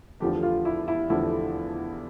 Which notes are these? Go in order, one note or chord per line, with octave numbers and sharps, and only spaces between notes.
E2 D3 F3 A3 G4
F4
E4
E4
E2 D3 F3 A3 E4